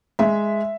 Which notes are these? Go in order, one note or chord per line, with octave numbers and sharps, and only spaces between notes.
G#3 E5